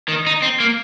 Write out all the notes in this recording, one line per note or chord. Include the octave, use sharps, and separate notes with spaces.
D#3
D#4
C4
A#3